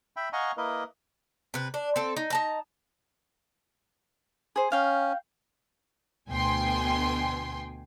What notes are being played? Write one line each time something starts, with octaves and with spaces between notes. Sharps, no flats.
E5 G5 B5
D#5 F5 F#5 G#5 A#5 C#6
A#3 E4 A#4 B4 D#5
C3 B4
D4
C4 A4
D#4
D#4 A5 A#5
G#4 C5
C#4 F5 G5
D2 B2 G5 G#5 C6